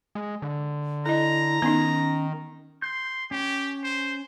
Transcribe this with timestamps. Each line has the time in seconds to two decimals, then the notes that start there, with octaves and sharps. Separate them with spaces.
0.15 G#3
0.42 D3
1.06 E4 A4 D#5 A#5
1.62 D#3 B3 C#4 D#4
2.82 C6 G6
3.31 C#4 G4
3.83 C5